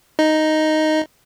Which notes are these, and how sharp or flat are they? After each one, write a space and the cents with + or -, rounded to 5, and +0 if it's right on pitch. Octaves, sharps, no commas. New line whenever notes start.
D#4 +0 D#5 +0